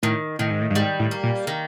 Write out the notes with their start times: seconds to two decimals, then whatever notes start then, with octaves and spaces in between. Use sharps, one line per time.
0.03 A2 D#3
0.39 A2 D#3
0.51 G#2
0.61 A2
0.70 G2
0.75 G#2 G3
0.99 A2
1.11 A#3
1.23 A#2
1.47 D#3